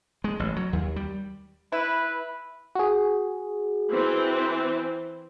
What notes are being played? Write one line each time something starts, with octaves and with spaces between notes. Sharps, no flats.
G#3
A1
F#3
D#2
G3
E4 B4
F#4 G#4
E3 C4